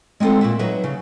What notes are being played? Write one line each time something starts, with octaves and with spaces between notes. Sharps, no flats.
G#3 C4 D#4 F4 A4
A#2 F#4 E5
F#3 D#4 B4 E5
C#3